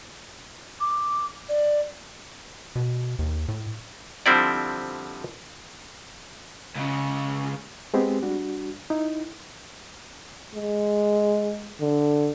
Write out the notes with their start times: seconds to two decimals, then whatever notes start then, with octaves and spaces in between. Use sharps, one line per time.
0.80 D6
1.49 D5
2.76 B2
3.19 D#2
3.48 A2
4.26 D3 F3 G3 C4 E4 D5
6.76 C#2 C#3
7.94 G#3 B3 C4 G4 G#4
8.22 G3 D4 F#4
8.90 D#4 E4
10.55 G#3
11.81 D3